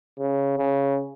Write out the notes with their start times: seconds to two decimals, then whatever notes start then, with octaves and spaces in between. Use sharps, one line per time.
0.19 C#3
0.58 C#3